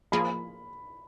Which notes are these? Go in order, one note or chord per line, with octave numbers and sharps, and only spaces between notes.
F3 A#3 F4 G#4 B5